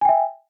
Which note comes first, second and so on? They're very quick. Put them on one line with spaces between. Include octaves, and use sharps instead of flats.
G#5 G5 E5